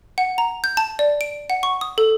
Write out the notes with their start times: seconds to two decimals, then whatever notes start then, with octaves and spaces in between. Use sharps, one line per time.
0.18 F#5
0.38 A#5
0.64 G6
0.77 A5
0.99 D5
1.21 D7
1.50 F#5
1.63 C#6
1.81 D#6
1.98 A4